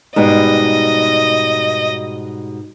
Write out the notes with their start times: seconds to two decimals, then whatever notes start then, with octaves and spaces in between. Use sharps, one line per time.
0.16 G#2 B2 G3 D#5